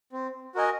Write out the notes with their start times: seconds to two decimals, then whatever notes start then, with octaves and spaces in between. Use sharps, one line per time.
0.12 C4
0.55 F#4 A#4 D#5 G#5